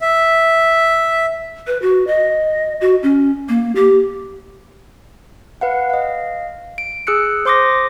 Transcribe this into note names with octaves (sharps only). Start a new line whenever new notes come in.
E5
B4
F#4
D#5
F#4
C#4
A#3
G4
B4 F5 F#5
D#5 F5
D7
G#4 E6 F#6 C#7
C5 C6 D6 D#6 A#6